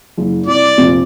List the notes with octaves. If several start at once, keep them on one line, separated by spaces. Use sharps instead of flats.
F#1
C2 D5
F1 A#2 F4